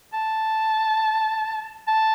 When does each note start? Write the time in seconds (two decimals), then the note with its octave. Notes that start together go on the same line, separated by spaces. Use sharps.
0.13 A5
1.88 A5